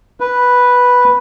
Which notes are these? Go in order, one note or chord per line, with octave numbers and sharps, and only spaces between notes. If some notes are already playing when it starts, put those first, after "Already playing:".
B4